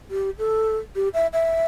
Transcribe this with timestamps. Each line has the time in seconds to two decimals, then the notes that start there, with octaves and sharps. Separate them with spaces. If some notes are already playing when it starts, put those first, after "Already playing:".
0.11 G4
0.38 A4
0.96 G4
1.14 E5
1.33 E5